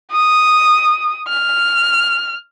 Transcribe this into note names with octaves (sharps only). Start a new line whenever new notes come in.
D#6
F6